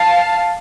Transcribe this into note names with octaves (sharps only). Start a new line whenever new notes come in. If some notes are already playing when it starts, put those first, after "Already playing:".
Already playing: F5 A5